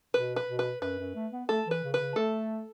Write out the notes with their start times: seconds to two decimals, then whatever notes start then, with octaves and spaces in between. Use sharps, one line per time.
0.14 B2 B4
0.36 B4
0.47 B2
0.59 B4
0.82 F#2 B4
0.99 F#2
1.15 A3
1.32 B3
1.49 A3 A4
1.66 E3 B4
1.83 C#3
1.94 B4
2.00 C#3
2.16 A3 A4